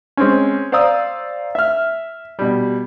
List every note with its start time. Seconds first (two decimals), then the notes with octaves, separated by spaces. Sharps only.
0.17 G#3 C4 C#4
0.72 C5 D5 F5 A#5 D#6 E6
1.55 E5 F6
2.39 B2 G3